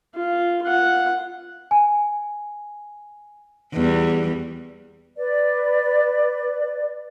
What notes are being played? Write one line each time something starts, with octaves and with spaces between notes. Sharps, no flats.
F4
F4 F#5
G#5
E2 G3
B4 D5